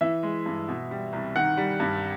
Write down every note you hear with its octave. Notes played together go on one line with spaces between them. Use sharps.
E3 E5
G#3
G2
B2
G3
C2
D#3 F#5
G3
G2